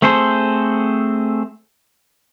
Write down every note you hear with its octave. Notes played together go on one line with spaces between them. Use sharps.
A3 C4 G#4 A4 C5